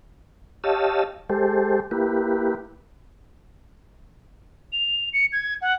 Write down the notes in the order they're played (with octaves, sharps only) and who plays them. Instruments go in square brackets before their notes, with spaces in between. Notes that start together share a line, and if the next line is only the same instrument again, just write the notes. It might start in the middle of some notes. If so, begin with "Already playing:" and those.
[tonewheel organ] G4 C#5 D#5 F5 A5 E6
G#3 G4 A4 C5
A#3 E4 G4 B4
[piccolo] F7
C#7
G#6
F#5